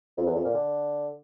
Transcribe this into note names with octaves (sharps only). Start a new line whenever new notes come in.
F2
E2
F2
A#2
D3